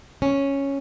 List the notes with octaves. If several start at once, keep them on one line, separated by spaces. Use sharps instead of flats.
C#4